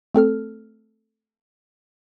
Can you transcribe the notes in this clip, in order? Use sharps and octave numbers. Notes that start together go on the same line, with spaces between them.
A3 C4 A4 F6